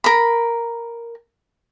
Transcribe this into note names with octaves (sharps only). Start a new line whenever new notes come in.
A#4 B5